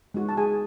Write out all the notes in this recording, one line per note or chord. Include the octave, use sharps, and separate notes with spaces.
G#3 D#4 F#4
A5
G#4 G#5